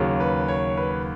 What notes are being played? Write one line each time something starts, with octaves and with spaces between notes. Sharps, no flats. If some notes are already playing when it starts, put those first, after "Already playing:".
Already playing: D#2 C#3 F#3
B4
C#5
B4